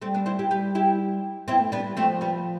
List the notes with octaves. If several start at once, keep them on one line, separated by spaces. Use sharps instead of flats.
G3 A3 C4
B3 D4
C4 E4
E4 G4
G3 G4 B4
E4 G4
B3 C4 E4
A3
G3 B3 D4
G3
F3 A3 C4
G3 B3